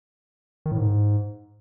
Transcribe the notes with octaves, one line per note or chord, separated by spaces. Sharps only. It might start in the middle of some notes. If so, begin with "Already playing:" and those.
D#3
A2
G#2